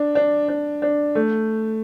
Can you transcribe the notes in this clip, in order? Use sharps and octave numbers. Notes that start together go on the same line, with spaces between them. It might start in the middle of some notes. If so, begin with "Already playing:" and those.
Already playing: D4
D4
D4
D4
A3